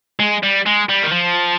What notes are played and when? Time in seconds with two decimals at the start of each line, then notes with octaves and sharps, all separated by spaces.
0.20 G#3
0.43 G3
0.66 G#3
0.89 G3
1.03 D#3
1.12 F3